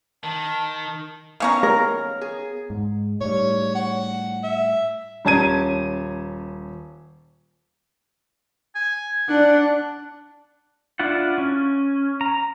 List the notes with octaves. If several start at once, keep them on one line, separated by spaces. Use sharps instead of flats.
D#3 A5
D#3 B3 C#4 C#5 F5 A#5
A#4
G#4
G#2
A2 G3 C#5
F#5
E5
D#1 C#4 A5 A#5 G#6 D#7
G#5
D4 F#5
D4 E4 F4 F#5
C#4
A#5